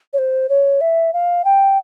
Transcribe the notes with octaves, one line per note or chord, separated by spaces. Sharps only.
C#5
C5
C#5
E5
F5
G5